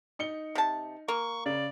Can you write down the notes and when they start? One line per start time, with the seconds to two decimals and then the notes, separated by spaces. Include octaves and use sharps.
0.19 D#4 C#7 G7
0.55 C3 A5
1.08 A#3 C#6
1.46 C#3 D5